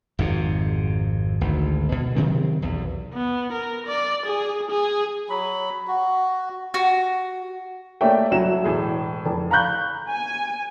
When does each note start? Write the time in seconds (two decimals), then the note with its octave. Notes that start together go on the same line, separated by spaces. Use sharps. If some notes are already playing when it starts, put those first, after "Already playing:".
0.19 G#1 F2 C3
1.41 G#1 D2
1.92 B2
2.16 C3 D#3 F#3 C4
2.62 B1 E2
3.14 B3
3.53 A#4
3.87 D5
4.26 G#4
4.71 G#4
5.29 F#3 B5
5.88 F#4
6.74 F#4
8.01 A3 A#3 C#5 D5 E5 G5
8.31 C2 F#3 E4 E7
8.64 E1 A2 G#4
9.25 F1
9.50 F5 A#5 B5 C#6 F#6 G6
10.09 G#5